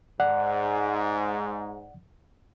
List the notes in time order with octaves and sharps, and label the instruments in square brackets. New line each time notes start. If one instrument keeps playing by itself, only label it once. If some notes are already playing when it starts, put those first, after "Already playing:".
[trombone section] G#2 [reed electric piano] D5 F#5